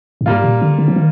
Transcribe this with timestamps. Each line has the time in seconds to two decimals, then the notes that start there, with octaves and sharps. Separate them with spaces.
0.21 G2
0.26 G#2 G3 A#3 F4
0.44 A#2
0.62 D3
0.79 D3
0.88 F3
0.96 D#3